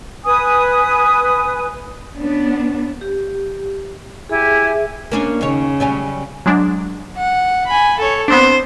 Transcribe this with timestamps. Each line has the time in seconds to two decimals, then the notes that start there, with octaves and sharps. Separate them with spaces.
0.25 B4 G#5 D#6
2.15 B3 C#4 D4
3.01 G4
4.29 E4 G4 G#4 E5 G#5
5.12 A#3 C#4 D4
5.41 D#2 C#3 C#5
5.80 F#3 G3 C#4
6.46 F#3 G#3 D4
7.18 F#5
7.67 G#5 B5
7.99 A4 C#5
8.28 B3 C4 D4 C5